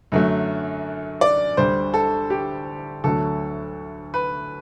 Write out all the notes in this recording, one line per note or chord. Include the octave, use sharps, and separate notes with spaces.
F#2 D3 F#3 A3
D5
D2 D3 G3 C5
A4
G4
D2 D3 F#3 A3 A4
B4